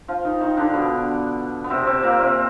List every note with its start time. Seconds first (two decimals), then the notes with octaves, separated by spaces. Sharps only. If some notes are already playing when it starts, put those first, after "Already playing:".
0.08 F3 F4
0.25 D#3 D#4
0.41 D#3 D#4
0.57 D3 D4
0.73 B2 B3
1.64 B3
1.70 C3 C4
1.87 C3 C4
2.03 A#2 A#3
2.19 C3 C4